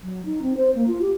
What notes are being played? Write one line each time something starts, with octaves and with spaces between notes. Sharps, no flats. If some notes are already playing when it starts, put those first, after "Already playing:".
F#3
D#4
C4
C5
A#3
F4
G4